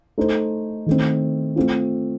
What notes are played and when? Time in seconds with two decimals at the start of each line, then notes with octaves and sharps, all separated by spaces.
0.18 A3 D#4 A4 C5
0.86 D#3 A3 C4
1.56 A3 C4 F4